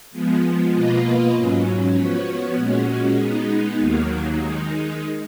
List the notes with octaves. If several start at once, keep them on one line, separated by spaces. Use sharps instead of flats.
F3 G#3 B3
B2 A#3 F4 B4 D#5
G#2 F#3 C#4
F3 B3 F#4 C#5
A#2 G#3 C#4 F#4
G#3 B3 D#4
D#2 D#3 F#3 A#3
D#3 G#3 D#4